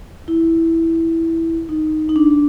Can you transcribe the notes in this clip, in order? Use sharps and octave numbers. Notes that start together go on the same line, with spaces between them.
E4
D#4
D#4
D4